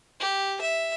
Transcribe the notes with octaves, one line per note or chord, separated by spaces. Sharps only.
G4
E5